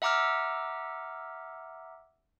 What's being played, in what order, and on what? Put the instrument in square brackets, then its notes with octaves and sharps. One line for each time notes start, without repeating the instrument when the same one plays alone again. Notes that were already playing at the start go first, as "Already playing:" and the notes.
[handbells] E5 F#5 A#5 D6 E6 F6